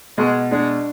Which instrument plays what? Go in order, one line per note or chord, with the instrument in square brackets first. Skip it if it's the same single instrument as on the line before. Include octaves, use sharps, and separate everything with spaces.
[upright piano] B2 [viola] G#3
[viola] G#3 [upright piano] D4